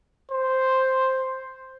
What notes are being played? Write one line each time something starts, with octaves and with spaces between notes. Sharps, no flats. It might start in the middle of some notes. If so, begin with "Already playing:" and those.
C5